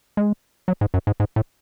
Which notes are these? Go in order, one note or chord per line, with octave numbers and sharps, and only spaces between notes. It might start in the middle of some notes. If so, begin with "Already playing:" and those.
G#3
F#3
G#2
F#2
G#2
G#2
A2